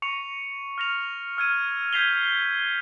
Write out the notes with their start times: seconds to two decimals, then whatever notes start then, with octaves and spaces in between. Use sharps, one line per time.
0.02 C#6 C#7 F7
0.78 F6 A#6 F7
1.37 E6 F6 G#6 D#7
1.93 G6 G#6 B6 C7 F7 G7